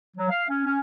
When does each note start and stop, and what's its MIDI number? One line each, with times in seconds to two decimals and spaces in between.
0.17 0.29 54
0.30 0.44 77
0.49 0.62 61
0.66 0.80 61